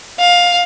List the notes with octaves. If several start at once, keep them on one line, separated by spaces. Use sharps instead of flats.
F5